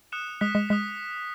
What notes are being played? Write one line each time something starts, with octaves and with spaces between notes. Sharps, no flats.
D#6 F#6 C#7 E7
G#3 D#6 F#6 B6
G#3
G#3 D#6 F#6 B6